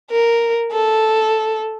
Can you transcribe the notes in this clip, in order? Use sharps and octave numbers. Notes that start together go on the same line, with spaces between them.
A#4
A4